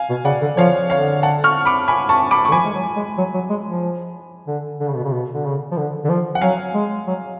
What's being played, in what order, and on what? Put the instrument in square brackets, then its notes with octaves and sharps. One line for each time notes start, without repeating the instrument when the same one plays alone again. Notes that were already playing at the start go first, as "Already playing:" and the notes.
Already playing: [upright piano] F5 G#5
[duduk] B2
[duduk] C#3 [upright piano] D5 F#5
[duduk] D3
[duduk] F3 [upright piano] C#5 F5
[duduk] D3 [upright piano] C#5 F5
[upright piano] F#5 A5
C#6 F6
B5 D6
G#5 B5
A5 C#6
B5 D6
C#6
[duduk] D3
[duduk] F3 [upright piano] G#5 B5
[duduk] G#3
F#3
G#3
F#3
F#3
G#3
F3
D3
D3
C#3
B2
C#3
B2
D3
C#3
F3
D3
D3
F3
[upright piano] F#5
[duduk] F#3 [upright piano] F5 G#5
[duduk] G#3
F#3